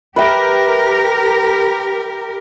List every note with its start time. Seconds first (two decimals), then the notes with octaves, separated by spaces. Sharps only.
0.16 G4 A#4 B4 E5 G5